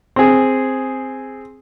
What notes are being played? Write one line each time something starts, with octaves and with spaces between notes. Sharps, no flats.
C4 G#4